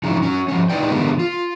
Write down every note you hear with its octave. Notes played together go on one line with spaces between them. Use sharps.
G#2 E3 F3 C#4 D#4 E4
F#3 C#4
F3 C#4
D#4 E4 B4 D5 G5
D3 E3 G#3 A#3 B3 G4
F4